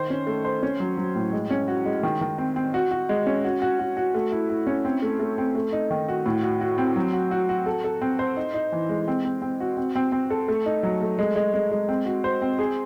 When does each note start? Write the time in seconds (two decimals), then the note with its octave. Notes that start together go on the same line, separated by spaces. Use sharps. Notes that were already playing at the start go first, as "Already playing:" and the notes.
Already playing: D#3 C5
0.10 C#4
0.27 A3
0.45 C5
0.63 C#4
0.80 F#3
0.97 F#3
1.15 A2
1.33 G#3
1.50 C#4
1.68 F#4
1.86 G#3
2.03 D#3
2.21 D#3
2.38 C4
2.56 C4
2.74 F#4
2.91 F#4
3.09 G#3
3.27 C#4
3.44 F#4
3.62 F#4
3.79 F#4
3.97 F#4
4.15 A3
4.32 E4
4.50 E4
4.67 C#4
4.85 C4
5.02 A3
5.20 A3
5.38 C4
5.55 A3
5.72 D#4
5.91 D#3
6.08 F#4
6.26 A2
6.43 F#4
6.61 F#4
6.78 C4
6.96 F#3
7.13 F#4
7.31 F#4
7.49 F#4
7.66 A4
7.84 A4
8.02 C4
8.19 C5
8.37 D#4
8.54 D#4
8.72 E3
8.89 G#3
9.08 C4
9.25 C4
9.42 C4
9.60 F#4
9.77 C4
9.96 C4
10.12 C4
10.30 A4
10.48 A3
10.66 D#4
10.83 F#3
11.01 A3
11.19 G#3
11.36 G#3
11.54 G#3
11.71 G#3
11.89 C4
12.06 F#4
12.24 C5
12.42 C4
12.59 G#4